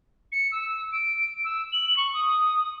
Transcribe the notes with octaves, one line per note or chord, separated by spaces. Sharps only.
C#7
E6
D7
E6
F#7
C#6
D#6